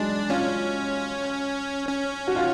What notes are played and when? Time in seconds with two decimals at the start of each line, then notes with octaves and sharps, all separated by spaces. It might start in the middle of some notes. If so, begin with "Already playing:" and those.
Already playing: F#3 G#3 D4
0.30 C#4 F4
1.89 C#4
2.28 F#4
2.36 F4